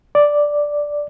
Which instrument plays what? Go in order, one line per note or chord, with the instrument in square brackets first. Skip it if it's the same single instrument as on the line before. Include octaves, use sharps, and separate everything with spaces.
[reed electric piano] D5